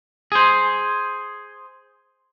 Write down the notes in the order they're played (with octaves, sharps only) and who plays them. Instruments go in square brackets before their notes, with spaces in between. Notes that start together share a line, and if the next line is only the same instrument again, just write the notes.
[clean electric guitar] G#4 C5